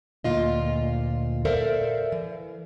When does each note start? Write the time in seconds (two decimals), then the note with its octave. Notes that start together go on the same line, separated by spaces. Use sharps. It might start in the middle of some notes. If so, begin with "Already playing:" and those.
0.24 D2 A#2 F4 D#5
1.45 A4 A#4 C5 D5 E5 F5
2.12 E3